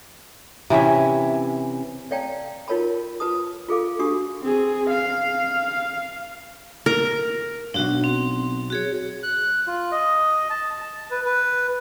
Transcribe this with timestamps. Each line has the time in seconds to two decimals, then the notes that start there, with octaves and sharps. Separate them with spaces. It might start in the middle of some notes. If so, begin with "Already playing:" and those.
0.70 C3 E3 C#4 E5
2.11 C#5 D5 F5 G5 A5 A#5
2.68 D#4 F4 A#4 C#5 A5 B5
3.20 F4 B4 A5 D#6
3.69 F4 G#4 A4 F5 D6
3.99 D4 F#4 G4 C#6 D#6
4.42 C4 G#4
4.90 F5
6.86 A#4
7.74 B1 G2 D4 F#4
8.04 C4
8.70 F#4 G#4 C#5
9.23 F#6
9.67 F4
9.92 D#5
10.50 A5
10.81 A5
11.11 B4
11.26 B4